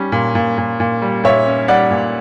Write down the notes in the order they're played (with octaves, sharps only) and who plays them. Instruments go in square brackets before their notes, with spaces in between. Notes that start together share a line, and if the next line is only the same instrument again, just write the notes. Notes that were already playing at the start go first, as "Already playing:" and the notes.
Already playing: [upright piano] G3 C#4
A#2
A#2
A#2
A#2
G3
A#2 C#5 E5
C#4
G3 D5 F#5
A#2